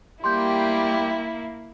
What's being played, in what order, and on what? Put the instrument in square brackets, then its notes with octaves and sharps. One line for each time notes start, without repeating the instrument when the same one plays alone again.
[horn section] G3 G4 [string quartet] A#3 E4 [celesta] C6 G6